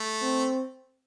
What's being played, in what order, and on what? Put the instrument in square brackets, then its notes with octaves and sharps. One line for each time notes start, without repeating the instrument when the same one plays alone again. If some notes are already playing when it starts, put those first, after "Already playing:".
Already playing: [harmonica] A3
[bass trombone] C4